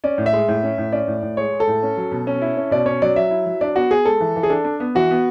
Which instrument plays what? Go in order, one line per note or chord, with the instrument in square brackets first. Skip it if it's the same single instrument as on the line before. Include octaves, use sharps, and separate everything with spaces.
[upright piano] C#4 [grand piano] D5
[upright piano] A2
[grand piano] E5
[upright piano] G#3
A2
C#4
A2
[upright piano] C#4 [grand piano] D5
[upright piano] A2
A2
[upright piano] G#3 [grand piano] C#5
[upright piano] G#3
[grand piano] A4
[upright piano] A2
C#4
F#3
B2
C#4
E4
C#4
[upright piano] B2 [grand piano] D5
[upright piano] C#4 [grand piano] C#5
[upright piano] F#3 [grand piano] D5
[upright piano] F#3 [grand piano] E5
[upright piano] E4
F#3
[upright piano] D4 [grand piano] D5
[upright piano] B3 [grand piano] F#4
[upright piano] B3 [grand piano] G#4
[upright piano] G#3 [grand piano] A4
[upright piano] E3
E3
[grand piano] G#4
[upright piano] D4 [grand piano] A4
[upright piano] D4
B3
[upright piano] E3 [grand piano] F#4
[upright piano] B3